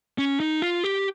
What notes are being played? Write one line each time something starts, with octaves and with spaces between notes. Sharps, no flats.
C#4
D#4
F4
G4